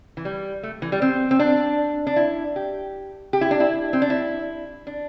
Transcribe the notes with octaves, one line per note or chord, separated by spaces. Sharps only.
E3
G3
A3
E3
G3
C4
C4
D4
D4
E4
G4
G4
E4
D4
E4
C4
D4
E4
D4